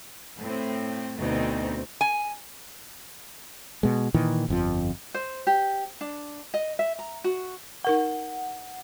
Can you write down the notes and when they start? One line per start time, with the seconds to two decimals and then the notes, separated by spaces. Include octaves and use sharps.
0.40 A2 C4
1.18 D2 B2 C4 D#4
2.01 G#5
3.83 B2 G#3
4.14 A#2 D#3 E3
4.48 G1 F2 F3
5.14 C5
5.47 G4
6.01 D4
6.54 D#5
6.79 E5
6.99 A#5
7.24 F#4
7.85 D#4 A#4 F#5 C#6